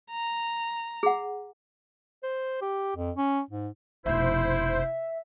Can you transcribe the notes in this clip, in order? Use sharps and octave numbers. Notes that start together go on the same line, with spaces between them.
A#5
G#4 F#5
C5
G4
F2
C#4
G#2
F1 B2 E4 C5 E5